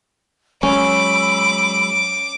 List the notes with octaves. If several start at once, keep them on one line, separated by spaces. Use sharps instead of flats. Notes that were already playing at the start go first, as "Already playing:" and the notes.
F#3 G#3 C#4 B5 D6 E6